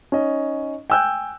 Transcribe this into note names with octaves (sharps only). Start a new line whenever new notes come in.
C#4 D#4 D#5
G5 G#5 E6 F#6 G6